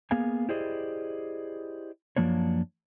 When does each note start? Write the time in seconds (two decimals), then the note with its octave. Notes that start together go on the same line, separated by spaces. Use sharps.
0.11 A#3 B3 G#4 F5 G#5
0.49 E4 G4 G#4 C5 D5 D#5
2.16 F#2 F3 A#3 D4 C#5